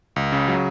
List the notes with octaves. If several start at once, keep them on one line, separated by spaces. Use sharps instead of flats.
C#2
C#3
F#3